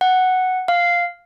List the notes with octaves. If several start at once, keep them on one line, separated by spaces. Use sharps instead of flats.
F#5
F5